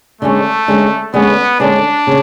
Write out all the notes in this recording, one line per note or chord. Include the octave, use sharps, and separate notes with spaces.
D3 G#3 A3 C#4
D3 G#3 C#4
D3 G#3 B3 C#4
D3 G#3 C#4 D4
C#3